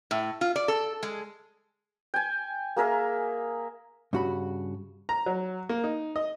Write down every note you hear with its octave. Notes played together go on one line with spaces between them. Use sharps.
A2
F4
D5
A4
G#3
G5 G#5
A#3 G#4 A#4 E5
G2 C#3 F#4 A#5 B5
A#5
F#3
A#3
D#4
D#5